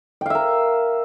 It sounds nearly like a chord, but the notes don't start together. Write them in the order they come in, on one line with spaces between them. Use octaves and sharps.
G5 F5 E5 A#4